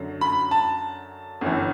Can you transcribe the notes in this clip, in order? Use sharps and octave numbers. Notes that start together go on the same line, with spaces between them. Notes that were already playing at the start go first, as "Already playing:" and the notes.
Already playing: F#2 D3 F#3
B5
A5
G1 F#2 E3